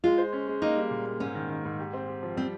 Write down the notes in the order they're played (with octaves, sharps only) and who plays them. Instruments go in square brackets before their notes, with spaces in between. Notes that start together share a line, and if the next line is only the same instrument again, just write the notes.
[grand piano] G#3 [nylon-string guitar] F4
[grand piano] C5
C#4
G#3
[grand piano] A#3 [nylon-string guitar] D#4
[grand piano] G3
A#2
A#3
[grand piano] G#2 [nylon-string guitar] C#4
[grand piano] D#3
D#3
G#2
G4
C4
G4
F3
[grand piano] G3 [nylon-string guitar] C4